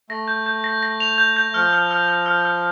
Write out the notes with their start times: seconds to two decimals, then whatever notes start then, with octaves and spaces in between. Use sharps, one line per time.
0.09 A3 A#6
0.28 G6
0.46 G6
0.64 A#6
0.83 A#6
1.00 F7
1.18 G6
1.37 G6
1.54 F3 F6
1.73 F6
1.91 F6
2.08 F6
2.26 F6
2.45 F6